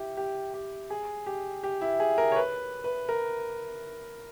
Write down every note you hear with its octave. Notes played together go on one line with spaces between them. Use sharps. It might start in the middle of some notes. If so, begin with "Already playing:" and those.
Already playing: E4 G4
G4
G4
G#4
G4
G4
E4
G#4
A#4
C#5
B4
B4
A#4